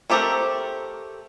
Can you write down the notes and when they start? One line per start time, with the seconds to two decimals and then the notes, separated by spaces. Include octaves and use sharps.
0.10 A3 C4 G4 A4 A#4